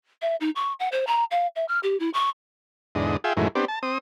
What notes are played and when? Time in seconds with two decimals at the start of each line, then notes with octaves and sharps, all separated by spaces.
0.22 E5
0.40 D#4
0.56 C#6
0.80 F#5
0.92 C5
1.07 A#5
1.31 F5
1.56 E5
1.68 F6
1.83 G4
2.00 E4
2.14 C#6
2.95 E2 G#2 D3 D#5
3.24 F4 G#4 E5 G5
3.37 F#2 A2 D#3 E3 G#3
3.55 B3 C4 D4 G4
3.68 A5
3.83 C4 D#6